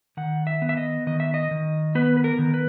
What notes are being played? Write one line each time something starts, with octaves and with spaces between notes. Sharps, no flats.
D#3 F#5
E5
B3
E5
D#5
D#3 D#5
E5
D#5
D#3
B3 B4
B4
A#4
D#3
B4